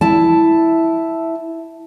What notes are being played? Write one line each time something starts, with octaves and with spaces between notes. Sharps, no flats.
E4 A5